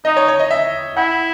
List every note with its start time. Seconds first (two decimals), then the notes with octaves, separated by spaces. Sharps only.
0.05 D#4 D#5
0.17 C#5
0.28 C#5
0.39 D#5
0.51 E5
0.97 E4 F#5